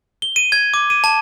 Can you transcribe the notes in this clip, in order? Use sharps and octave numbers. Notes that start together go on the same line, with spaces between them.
G7
D#7
G#6
D6
D#7
A5